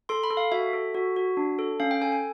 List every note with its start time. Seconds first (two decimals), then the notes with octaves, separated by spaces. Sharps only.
0.09 A4 C6
0.23 B5
0.31 A4
0.37 F5
0.52 F#4 E5
0.73 A4
0.94 F#4
1.16 F#4
1.37 D4
1.59 A4
1.80 C#4 F5
1.91 G5
2.02 A4 G#5
2.12 G#5